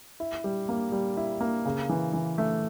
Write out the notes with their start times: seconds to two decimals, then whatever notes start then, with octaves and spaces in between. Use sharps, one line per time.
0.20 E4
0.44 G3
0.69 A#3
0.92 G3
1.17 E4
1.40 A#3
1.66 C#3
1.89 E3
2.13 E3
2.38 A3